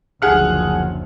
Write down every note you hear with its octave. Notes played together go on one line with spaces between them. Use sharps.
F#1 D2 F3 G#4 F#5 F6